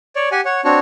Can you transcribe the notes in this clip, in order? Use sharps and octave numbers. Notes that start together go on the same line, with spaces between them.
C#5 D5
G4 F#5 G#5
C#5 F#5
C4 D4 F#4 C#5